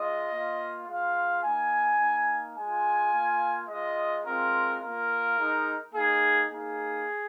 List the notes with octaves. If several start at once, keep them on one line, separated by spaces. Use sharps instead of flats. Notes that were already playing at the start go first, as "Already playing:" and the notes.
Already playing: G#3 F4 D#5
A#3 F4
G#3 F4 F5
A#3 D#4 G#5
A#3 D#4
G#3 F4 G#5
A#3 F4
G#3 F4 D#5
G#3 C4 F4 A#4
A#3 F4 A#4
G#3 D#4
A#3 D#4 G#4
A#3 D#4 G#4